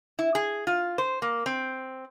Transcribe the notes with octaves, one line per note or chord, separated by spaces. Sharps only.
E4
G#4
F4
C5
A#3
C4